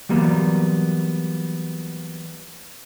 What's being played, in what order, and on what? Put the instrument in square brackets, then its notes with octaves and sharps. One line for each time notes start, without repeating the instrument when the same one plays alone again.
[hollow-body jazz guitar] E3 F#3 G3 A#3 B3